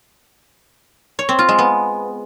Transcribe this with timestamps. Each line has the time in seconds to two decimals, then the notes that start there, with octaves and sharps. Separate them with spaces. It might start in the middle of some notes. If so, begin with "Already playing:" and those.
1.19 C#5
1.29 C4
1.39 F4
1.49 G#3
1.59 B3